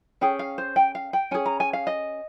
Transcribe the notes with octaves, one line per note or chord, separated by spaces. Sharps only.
C#4 G#4 G5
F5
C5
G5
F5
G5
C#4 G#4 G#5
A#5
G#5
F5
D#5